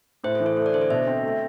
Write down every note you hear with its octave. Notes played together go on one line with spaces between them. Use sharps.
A2 C5
A4
E3
A4
A3 C5
D5
D3 C5
A4
B2 E5
C4
A3